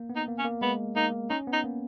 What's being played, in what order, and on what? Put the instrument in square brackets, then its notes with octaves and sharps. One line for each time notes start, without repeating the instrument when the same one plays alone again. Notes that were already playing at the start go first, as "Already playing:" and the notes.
Already playing: [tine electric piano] A#3
B3
[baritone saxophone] D#4
[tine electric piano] A#3
[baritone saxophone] C#4
[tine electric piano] A#3
[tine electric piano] G#3 [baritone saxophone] B3
[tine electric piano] A#3 [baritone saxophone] D#4
[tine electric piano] C#4 [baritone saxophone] D#4
[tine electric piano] B3
[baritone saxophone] D#4
[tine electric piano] A#3